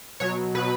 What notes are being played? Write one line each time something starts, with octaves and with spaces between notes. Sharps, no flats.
B2 F#3 C#5
B2 F#3 B4